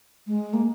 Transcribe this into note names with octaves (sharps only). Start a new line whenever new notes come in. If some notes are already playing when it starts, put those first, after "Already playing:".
G#3
A#3